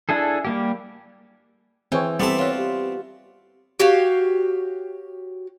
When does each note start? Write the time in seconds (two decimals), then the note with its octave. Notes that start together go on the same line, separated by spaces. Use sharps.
0.09 D4 E4 G#4 A4
0.45 G3 A#3 G4
1.92 E3 C4 G#4 C#5 G5
2.20 G3 B3 C4 A4 D5 E5 A5
2.39 F4 F#4 C#5
2.57 G4
3.80 F#4 G4 C#5 F5